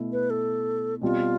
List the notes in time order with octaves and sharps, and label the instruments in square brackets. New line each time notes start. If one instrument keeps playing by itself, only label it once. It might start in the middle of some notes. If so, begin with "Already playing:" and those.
Already playing: [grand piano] B2 A3 E4
[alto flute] B4
A4
[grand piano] B2 G3 C4 [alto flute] F4